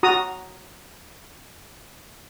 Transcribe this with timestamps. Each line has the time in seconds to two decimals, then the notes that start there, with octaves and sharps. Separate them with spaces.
0.03 F#4 A#5 D#6